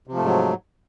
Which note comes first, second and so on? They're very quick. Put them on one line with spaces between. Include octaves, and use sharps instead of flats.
C3 F3 A3 G#2 F#3